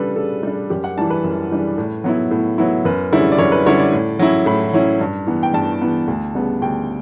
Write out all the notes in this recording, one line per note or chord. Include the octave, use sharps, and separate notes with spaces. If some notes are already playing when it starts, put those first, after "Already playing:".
Already playing: C#3 G3 D4 A4 B4
C#3 A4
G3 D4
F#2 G4
F#5
E3 G3 D4 A5
B4
F#2
E3 G3 D4
A2
F#3 B3 E4
A2
F#3 B3 E4
F#2 B4
D3 G3 C#4 E4
D5
F#2 C#5
B4
D3 G3 C#4 E4 C#5
D5
A2
F#3 C#4 E4
A2 B5
F#3 C#4 E4
G2
E3 B3
G5
G2 A5
E3 B3
D2
C#3 G3 B3
D2 G5